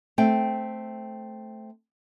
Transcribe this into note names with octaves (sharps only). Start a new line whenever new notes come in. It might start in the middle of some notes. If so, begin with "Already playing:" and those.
A3 C4 G5